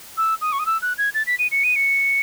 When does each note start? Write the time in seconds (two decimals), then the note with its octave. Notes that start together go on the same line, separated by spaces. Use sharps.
0.17 E6
0.41 D#6
0.52 C#6
0.59 D#6
0.66 E6
0.82 F#6
0.98 G#6
1.14 A6
1.27 B6
1.39 D#7
1.51 C#7
1.64 D#7
1.76 C#7